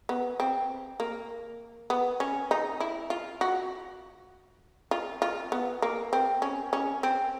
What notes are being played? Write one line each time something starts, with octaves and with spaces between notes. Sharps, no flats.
B3
C4
A#3
B3
C#4
D#4
E4
F4
F#4
F4
F4
B3
A#3
C4
C#4
C#4
C4